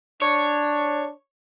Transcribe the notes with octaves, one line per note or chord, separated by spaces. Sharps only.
D4 C#5